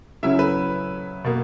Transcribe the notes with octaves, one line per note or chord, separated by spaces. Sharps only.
C#3 F#3 C#4 E4 E5
B4
B2 A#3